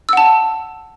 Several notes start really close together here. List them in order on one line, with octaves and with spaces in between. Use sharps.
E6 F#5 A5